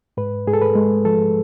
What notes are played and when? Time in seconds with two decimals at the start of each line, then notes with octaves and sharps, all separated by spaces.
0.17 G#2 B4
0.47 G#2 G#4
0.53 A4
0.62 B4
0.75 G#3
1.05 F3 A4